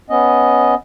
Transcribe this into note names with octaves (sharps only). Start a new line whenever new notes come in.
B3 C#4 D#5